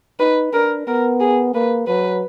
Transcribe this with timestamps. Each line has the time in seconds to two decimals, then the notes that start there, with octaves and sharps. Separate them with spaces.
0.20 D#4 B4
0.53 D4 A#4
0.87 B3 A#4
1.21 G#4
1.54 A#3 B4
1.87 F#3 B4